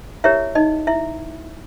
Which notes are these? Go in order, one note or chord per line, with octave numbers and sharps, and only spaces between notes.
E4 G4 A#4 C#5 E5
D#4 D#5
E4 E5